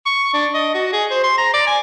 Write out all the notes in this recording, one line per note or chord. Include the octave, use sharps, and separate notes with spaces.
C#6
D4
D#5
F#4
G#4
C5
C6
A#5
D5
G#5